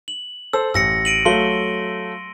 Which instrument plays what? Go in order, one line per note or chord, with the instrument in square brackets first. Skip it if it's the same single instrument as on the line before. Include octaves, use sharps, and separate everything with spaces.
[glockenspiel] F#7
[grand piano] A4 C5 [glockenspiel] E6
[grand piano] A1 [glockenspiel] E6 A#6 C#7
[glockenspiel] D7 D#7 F#7
[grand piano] F#3 A3 F5 [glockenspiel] C6 G7